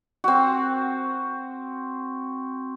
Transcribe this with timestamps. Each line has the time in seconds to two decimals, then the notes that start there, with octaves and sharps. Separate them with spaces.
0.24 C4 F#4